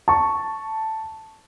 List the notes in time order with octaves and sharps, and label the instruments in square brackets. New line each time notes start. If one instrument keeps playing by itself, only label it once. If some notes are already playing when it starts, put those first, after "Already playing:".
[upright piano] A5 C#6